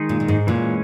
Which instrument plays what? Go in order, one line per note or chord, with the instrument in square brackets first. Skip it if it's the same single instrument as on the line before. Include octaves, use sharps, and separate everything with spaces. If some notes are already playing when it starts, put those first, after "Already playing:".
Already playing: [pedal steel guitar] D#3 G#3 D#4 G#4
[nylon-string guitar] A#2
A#2
G#2
[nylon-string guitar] A#2 [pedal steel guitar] E3 G#3 C#4